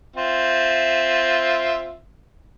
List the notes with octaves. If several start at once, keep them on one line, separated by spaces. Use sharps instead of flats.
C4 F4 E5